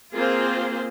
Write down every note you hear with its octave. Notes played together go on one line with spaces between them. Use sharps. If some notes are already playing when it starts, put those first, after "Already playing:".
A#3 C4 F4 G#4 C5